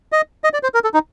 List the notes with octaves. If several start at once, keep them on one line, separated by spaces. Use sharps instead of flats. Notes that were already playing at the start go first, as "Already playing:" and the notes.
D#5
D#5
D5
C5
A#4
A4
D#4